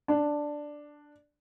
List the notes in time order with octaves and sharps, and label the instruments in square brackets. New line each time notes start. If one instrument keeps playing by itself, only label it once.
[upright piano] D4